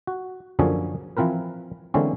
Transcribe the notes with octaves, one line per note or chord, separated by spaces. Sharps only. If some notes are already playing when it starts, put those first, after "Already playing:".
F#4
F#2 D3 F3 A#3 C#4 G#4
E3 F3 C4 A#4 B4
D3 E3 G#3 A#3 C4 C#4